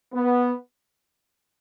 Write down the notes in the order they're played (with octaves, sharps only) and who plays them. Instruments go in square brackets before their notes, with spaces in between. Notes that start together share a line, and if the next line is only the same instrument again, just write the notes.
[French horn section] B3